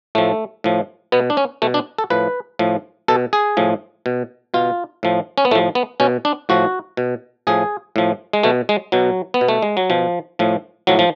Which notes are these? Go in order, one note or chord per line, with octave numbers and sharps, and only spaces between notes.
A2 F3 A3
A2 F3
B2 B3
D4
C#4
B2 A3
D4
A4
A2 F3 B4
A2 F3
B2 A4
G#4
A2 F3
B2
B2 F4
A2 F3
C#4
B3
A2 F3 A3
B3
B2 C#4
D4
A2 F3 F#4
B2
A2 F3 G#4
A2 F3
G#3
B2 A3
G#3
B2 F#3
B3
B2
A3
G#3
F#3
B2 F3
A2 F3
A2 F3 F#3
F3